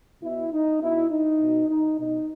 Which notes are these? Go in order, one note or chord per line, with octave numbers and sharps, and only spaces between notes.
B2 E4
D#4
B2 E4
D#4
B2
D#4
B2 D#4